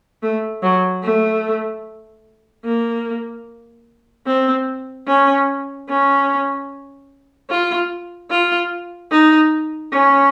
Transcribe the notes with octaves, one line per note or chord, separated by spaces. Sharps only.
A3
F#3
A3
A#3
C4
C#4
C#4
F4
F4
D#4
C#4